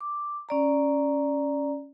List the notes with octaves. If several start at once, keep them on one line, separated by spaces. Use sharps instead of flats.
D6
C#4 D5 A#5